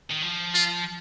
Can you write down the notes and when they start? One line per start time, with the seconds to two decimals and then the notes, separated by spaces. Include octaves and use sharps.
0.10 D#3
0.22 F3
0.54 F4